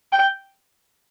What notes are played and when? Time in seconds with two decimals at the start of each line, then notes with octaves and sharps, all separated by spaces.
0.12 G5